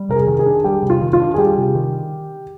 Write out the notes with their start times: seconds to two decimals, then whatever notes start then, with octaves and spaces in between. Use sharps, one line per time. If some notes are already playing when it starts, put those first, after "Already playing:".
Already playing: G3
0.09 C3 A#4
0.16 G#4
0.27 D#3
0.39 G#4
0.46 D4
0.64 G3 G4
0.83 C3
0.90 F4
1.02 D#3
1.13 F4
1.20 D4
1.34 G#4
1.38 G3 G4
1.57 C3
1.75 D#3